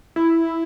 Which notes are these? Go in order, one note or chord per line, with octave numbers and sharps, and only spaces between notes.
E4